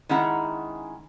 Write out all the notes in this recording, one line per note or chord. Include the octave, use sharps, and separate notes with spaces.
D#3 G#3 C#4 E4 F#5 A#5